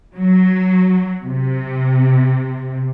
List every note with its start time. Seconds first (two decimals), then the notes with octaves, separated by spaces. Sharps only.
0.17 F#3
1.23 C3